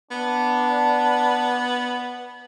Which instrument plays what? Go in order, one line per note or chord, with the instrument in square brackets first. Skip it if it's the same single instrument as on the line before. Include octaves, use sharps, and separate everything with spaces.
[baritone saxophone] B3 [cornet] D4